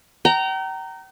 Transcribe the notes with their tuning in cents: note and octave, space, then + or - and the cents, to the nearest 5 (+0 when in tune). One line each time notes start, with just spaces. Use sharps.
G5 -40 A#5 -10